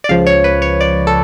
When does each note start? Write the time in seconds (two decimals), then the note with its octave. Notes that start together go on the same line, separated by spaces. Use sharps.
0.04 D5
0.09 C#2 C#3 F3 F5
0.27 C#5
0.44 B4
0.62 C#5
0.81 D5
1.07 A4